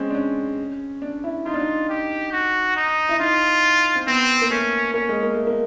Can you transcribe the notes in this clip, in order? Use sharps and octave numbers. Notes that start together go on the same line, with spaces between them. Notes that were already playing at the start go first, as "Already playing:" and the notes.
Already playing: G#3 C4 C#4
D4
C#4
D4
E4
D#4 F4
D4
D#4
G4
F#4
D#4
E4
D#4 F4
C4
B3 C4
A#3
A3 C#4
A#3 C#4
G#3
A#3
A3
A#3